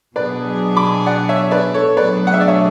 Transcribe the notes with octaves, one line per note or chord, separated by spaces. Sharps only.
B2 F#3 B3 D4 G#4 B4 D5
B5 D6
D5 F#5
C#5 E5
B4 D5
A4 C#5
B2 F#3 A3 D4 G#4 B4 D5
F#5
E5
D5
C#5 E5